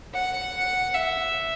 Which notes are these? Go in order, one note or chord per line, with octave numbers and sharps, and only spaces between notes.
F#5
E5